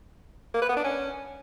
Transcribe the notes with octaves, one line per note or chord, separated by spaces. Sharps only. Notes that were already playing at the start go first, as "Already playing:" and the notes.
A#3
B4
B3
D4
C#4